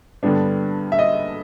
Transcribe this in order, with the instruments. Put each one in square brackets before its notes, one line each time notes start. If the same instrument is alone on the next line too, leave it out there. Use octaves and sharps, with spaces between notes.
[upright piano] G2 D3 G3 B3 D4
E5
D#5